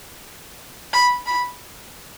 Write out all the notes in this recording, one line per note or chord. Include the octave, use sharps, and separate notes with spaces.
B5
B5